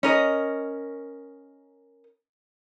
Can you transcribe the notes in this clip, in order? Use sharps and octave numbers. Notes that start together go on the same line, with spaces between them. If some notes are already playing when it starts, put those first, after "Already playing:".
C#4 A#4 D#5